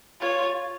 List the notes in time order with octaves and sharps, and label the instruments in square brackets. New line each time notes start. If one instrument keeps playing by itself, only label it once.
[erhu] F4 [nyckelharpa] C#5